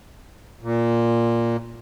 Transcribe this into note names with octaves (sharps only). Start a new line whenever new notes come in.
A#2